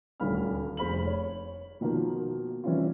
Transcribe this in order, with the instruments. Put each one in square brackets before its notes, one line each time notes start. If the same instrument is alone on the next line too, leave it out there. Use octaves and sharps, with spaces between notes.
[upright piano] D#1 D2 D4 F5 B5 F6
F1 G#4 C5 B5 F6 F#7
C#5
B2 D#3 F3 A#3 A#4
E3 G3 C4 C#4 E4 F4